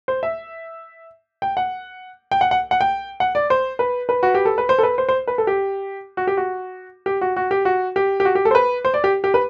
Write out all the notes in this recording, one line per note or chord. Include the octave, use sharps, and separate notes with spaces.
C5
E5
G5
F#5
G5
F#5
F#5
F#5
G5
F#5
D5
C5
B4
B4
F#4
G4
A4
B4
C5
A4
B4
C5
C5
B4
A4
G4
F#4
G4
F#4
G4
F#4
F#4
G4
F#4
G4
G4
F#4
G4
A4
C5
B4
C5
D5
G4
G4
B4